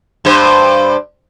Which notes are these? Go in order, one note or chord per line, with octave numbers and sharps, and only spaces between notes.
G2 C5